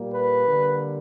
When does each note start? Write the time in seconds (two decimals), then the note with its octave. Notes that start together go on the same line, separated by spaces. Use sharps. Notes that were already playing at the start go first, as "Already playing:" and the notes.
Already playing: A#2 G3 A#3
0.14 B4
0.47 D3 G3 A#3